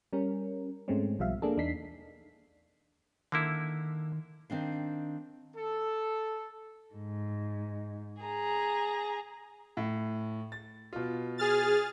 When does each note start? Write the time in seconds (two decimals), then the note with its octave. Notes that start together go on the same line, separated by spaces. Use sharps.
0.13 G3 C#4 A#4
0.88 G#2 G#3 A3 C4 C#4
1.19 B1 B2 F3 G3 E5 F5
1.42 A#3 D4 G#4 A4
1.57 E2 D4 D#4 B6 C7
3.32 D3 D#3 A#3 E4
4.50 D#3 C4 D4 F5
5.56 A4
6.94 G#2
8.23 G#4 A#5
9.77 A2
10.52 A6
10.93 B2 F4
11.38 G#4 F6 A6